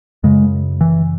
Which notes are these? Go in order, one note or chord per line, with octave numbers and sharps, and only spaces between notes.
F#2 C#3 G#3
E3